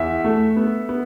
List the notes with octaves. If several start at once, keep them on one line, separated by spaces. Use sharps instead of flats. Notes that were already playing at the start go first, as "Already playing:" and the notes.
Already playing: E2 E5
A3
B3
B3